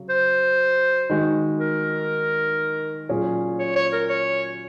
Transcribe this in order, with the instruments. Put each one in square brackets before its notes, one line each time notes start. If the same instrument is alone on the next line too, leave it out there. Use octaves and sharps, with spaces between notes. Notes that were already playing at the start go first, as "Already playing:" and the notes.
Already playing: [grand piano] C#3 F#3 C#4
[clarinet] C5
[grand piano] D#3 G#3 D#4 F#4
[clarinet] A#4
[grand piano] A#2 F#3 C#4 G#4
[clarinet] C#5
C#5
A#4
C#5